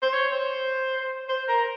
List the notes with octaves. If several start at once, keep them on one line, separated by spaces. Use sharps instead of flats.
C5
C#5
C5
C5
A#4